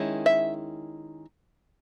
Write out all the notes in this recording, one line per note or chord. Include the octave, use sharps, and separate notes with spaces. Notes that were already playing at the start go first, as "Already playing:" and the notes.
Already playing: D#3 G#3 C#4 E4
E5